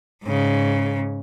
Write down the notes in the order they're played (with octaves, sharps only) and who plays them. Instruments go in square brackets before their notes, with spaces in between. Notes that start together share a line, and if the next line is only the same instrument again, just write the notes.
[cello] G#2 C#3